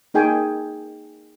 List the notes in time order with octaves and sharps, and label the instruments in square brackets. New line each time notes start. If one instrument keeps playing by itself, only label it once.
[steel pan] A#3 D#4 G#4 G5 G#5